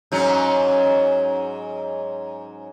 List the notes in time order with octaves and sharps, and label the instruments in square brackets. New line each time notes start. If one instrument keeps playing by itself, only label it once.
[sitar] G#2 F#3 C#4